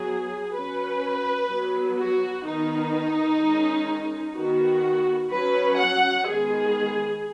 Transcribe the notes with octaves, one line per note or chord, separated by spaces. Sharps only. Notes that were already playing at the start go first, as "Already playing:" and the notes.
Already playing: F#3 B3 G#4
F#3 C#4 B4
F#3 B3
F#4
D#3 B3 D#4
D#3 G#3 C#4
D#3 B3 F#4
F#3 C#4 B4
F#5
D#3 G#3 B3 G#4